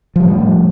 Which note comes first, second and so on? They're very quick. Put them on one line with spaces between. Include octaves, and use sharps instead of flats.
F3 G3 A2